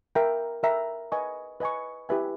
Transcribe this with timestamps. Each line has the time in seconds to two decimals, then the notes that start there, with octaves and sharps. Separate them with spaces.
0.15 A#4 E5 G5 A#5
0.63 A#4 E5 G5 A#5
1.12 B4 D#5 G#5 C#6
1.60 B4 D#5 G#5 C#6
2.09 E4 G4 B4 E5 G#5